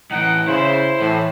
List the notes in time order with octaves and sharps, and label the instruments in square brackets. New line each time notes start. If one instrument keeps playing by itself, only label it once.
[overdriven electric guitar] A2 E3 [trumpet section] D#4 F#5 G5
[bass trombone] C#3 [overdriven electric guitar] E4 [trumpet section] C5
[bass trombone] A2 [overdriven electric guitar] E3